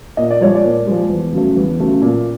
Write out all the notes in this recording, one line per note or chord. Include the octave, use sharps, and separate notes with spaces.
A#2 D#5
D5
F3 G#3 C#5
D5
A#2
F3 G#3
E2
C#3 F#3 A3
E2
C#3 F#3 A3
A#2